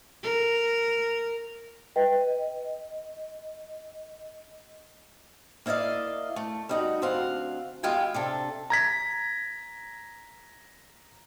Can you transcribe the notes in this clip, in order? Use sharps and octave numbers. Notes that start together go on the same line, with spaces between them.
A#4
B4 D#5 G5
D#5
A#3 E4 D5 D#5 F5
A3
G3 D#4 F#4
D2 C4 F5 F#5
E2 G#3 F4 G4 G5 G#5
C3 D4 A4
A#5 G#6 B6